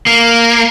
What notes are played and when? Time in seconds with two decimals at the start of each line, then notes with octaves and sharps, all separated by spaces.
0.06 A#3